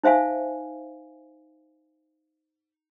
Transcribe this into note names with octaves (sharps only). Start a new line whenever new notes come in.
D#4 C5 E5 F5 G#5